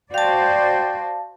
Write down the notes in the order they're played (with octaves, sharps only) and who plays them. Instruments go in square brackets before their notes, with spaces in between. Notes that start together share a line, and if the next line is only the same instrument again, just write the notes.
[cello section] F#4 C5 D5 [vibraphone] F5 A5 [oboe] G5